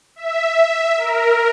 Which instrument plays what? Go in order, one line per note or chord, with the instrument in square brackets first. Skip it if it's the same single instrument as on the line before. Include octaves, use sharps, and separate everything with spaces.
[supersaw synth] E5
A#4